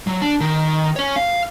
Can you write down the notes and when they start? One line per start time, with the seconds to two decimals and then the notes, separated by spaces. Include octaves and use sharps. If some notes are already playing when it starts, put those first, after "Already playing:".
0.07 F#3
0.22 D4
0.40 D#3
0.96 C#4 C#5
1.16 F5